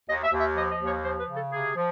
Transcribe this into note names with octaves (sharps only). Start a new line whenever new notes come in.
D#2 D#5
E5
D#2
E5
F3 D#5
D#5
D#2
C#5
F3 C5
B4
C#3
A4
C3 G#4
F3